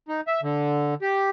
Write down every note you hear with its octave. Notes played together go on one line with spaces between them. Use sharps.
D#4
E5
D3
G4